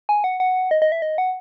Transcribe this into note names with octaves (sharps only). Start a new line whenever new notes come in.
G#5
F#5
F#5
D#5
D#5
E5
D#5
F#5